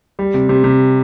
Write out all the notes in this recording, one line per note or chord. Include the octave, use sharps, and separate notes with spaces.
G3
C3
C3
C3